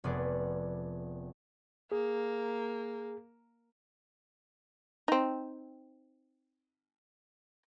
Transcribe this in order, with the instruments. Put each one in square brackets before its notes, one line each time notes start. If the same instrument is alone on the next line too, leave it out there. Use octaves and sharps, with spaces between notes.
[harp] F1 B3 G#4 D5
[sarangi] A#3 [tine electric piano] G#4
[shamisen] C4 D#4